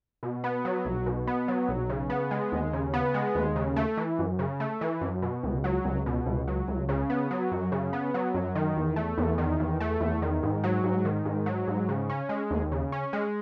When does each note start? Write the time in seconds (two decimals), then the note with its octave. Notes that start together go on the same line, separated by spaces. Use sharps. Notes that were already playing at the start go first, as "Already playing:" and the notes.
0.23 B2
0.44 B3
0.65 F#3
0.85 B1
1.06 B2
1.27 B3
1.48 F#3
1.69 B1
1.90 C#3
2.10 B3
2.31 G#3
2.52 D#2
2.73 C#3
2.94 B3
3.14 G#3
3.35 D#2
3.56 C#3
3.76 A3
3.97 E3
4.19 F#2
4.39 C#3
4.60 A3
4.81 E3
5.01 F#2
5.22 B2
5.43 C#2
5.64 F#3
5.85 C#2
6.06 B2
6.26 C#2
6.48 F#3
6.68 C#2
6.89 C#3
7.10 B3
7.31 F#3
7.52 F#2
7.72 C#3
7.93 B3
8.14 F#3
8.34 F#2
8.55 D#3
8.77 E2
8.96 A3
9.18 E2
9.38 D#3
9.60 E2
9.80 A3
10.00 E2
10.22 D#3
10.43 G#2
10.64 F#3
10.84 G#2
11.05 D#3
11.25 G#2
11.46 F#3
11.67 G#2
11.89 C#3
12.10 C#4
12.29 G#3
12.51 D#2
12.72 C#3
12.92 C#4
13.13 G#3